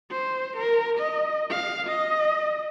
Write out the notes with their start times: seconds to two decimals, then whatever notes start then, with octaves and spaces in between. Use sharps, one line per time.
0.11 C5
0.57 A#4
0.98 D#5
1.50 F5
1.87 D#5